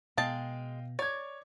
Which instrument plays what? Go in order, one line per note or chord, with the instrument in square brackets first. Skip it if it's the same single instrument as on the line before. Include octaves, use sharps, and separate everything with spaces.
[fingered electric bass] B2 B3 [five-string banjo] G#3 A5 [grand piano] D#5 F5 G5
[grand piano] C#5 G#6 [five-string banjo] D5